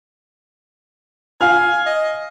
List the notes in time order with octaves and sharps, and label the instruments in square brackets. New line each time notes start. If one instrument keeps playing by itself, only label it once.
[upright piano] F5 F6 [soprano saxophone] G#5
[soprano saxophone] D#5